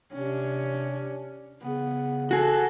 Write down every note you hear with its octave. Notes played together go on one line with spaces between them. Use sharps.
C3 C#4 D4
C#3 B3
F#4 G#4 A4